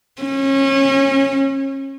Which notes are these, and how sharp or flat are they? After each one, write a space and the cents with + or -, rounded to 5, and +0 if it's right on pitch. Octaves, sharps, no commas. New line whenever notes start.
C#4 -30